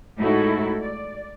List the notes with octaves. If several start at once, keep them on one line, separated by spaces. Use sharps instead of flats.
A2 G#3 D#4 E4 F#4 A4
D5